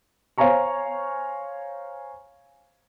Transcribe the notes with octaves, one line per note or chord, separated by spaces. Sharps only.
C5 C#5 F5 G#5 A#5 C#6